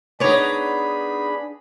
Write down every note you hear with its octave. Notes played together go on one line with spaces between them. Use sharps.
B3 D4 D#4 G#4 C#5 D5 B5